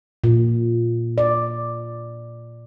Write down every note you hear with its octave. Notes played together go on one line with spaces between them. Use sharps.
A#2
D5